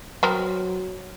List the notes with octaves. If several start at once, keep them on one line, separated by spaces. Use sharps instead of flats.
F#3 B3 C4 A#4